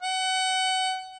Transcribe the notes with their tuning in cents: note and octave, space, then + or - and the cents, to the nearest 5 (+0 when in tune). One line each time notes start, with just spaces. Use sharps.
F#5 +25